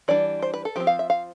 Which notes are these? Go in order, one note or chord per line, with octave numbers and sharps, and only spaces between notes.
E3 G3 D4 D5
C5
B4
A4
F3 C4 G4
F5
E5
F5